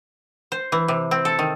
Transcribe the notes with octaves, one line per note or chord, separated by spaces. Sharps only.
C5
E3
C3
C4
A4
D#3